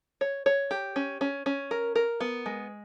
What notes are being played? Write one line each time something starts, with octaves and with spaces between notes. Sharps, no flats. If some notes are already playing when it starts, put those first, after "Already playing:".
C#5
C#5
G4
C#4
C#4
C#4
A#4
A#4
B3
G#3